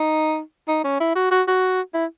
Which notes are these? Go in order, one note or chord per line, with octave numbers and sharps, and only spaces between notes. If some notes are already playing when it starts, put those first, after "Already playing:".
Already playing: D#4
D#4
C#4
E4
F#4
F#4
F#4
E4